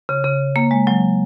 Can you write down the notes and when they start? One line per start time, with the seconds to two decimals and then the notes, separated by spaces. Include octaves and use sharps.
0.09 C#3
0.25 C#3
0.56 A#3
0.71 G#3
0.87 F#3